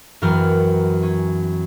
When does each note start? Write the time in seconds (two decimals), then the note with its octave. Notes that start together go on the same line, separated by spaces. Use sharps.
0.22 F#2 E3 B3 A#4 G5 F6
1.03 C#4